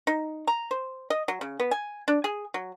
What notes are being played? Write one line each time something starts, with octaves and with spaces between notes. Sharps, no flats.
D#4
A#5
C5
D#5
F#3
C#3
B3
G#5
D4
G#4
F#3